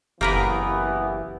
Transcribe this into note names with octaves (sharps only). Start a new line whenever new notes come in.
F#1 E3 A#3 B3 G4 A#4 B4